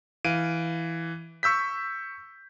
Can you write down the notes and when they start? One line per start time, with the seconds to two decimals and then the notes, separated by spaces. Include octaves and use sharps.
0.25 E3 F5 D7 D#7
1.43 C#6 E6 G6 B6